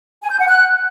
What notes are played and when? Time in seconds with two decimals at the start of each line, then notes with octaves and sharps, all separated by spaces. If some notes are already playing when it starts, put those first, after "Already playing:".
0.22 G#5
0.31 G6
0.40 F#5
0.48 F#6